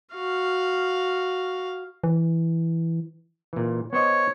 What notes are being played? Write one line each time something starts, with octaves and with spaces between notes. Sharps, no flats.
F#4 F5
E3
A#2 E3
B3 C5 C#5 D#5